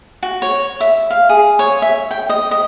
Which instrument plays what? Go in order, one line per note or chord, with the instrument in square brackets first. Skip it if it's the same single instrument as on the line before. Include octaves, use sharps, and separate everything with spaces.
[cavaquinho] F#4
C#5
E5
F5
G#4
C#5
E5
G5
D#5
D#5